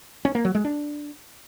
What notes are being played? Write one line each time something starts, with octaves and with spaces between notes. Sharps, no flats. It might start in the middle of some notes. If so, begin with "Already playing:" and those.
C#4
A#3
F#3
G#3
D4